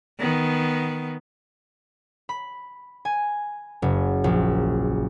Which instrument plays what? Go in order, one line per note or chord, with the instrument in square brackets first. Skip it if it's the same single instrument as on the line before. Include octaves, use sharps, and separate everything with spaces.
[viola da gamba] D#3 B3
[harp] B5
G#5
F#1
A#1